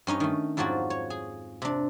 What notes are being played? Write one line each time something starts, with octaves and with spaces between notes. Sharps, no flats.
G2 C#4 D#4 D#5
D#3 A3
F2 G#2 F3 F#3 F#4 D5
C#5
G#4
C3 D4